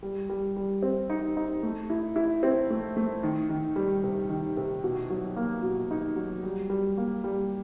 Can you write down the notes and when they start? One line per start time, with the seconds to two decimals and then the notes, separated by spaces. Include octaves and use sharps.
0.03 G3
0.29 G3
0.56 G3
0.82 C4
1.10 D#4
1.37 D#4
1.63 A3
1.90 E4
2.16 E4
2.43 C4
2.70 A3
2.96 A3
3.23 D#3
3.49 D#3
3.76 G3
4.03 C3
4.29 D#3
4.57 C3
4.84 B2
5.10 F#3
5.36 A#3
5.63 B2
5.91 D#4
6.16 F#3
6.43 G3
6.70 G3
6.97 A#3
7.24 G3